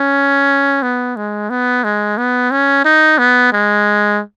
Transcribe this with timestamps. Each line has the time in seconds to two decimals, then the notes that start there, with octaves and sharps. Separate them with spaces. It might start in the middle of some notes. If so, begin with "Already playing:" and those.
Already playing: C#4
0.82 B3
1.16 G#3
1.50 B3
1.84 G#3
2.18 B3
2.51 C#4
2.85 D#4
3.18 B3
3.52 G#3